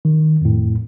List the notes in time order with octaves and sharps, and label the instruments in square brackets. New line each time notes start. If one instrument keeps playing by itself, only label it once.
[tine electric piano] D#3
F2 A2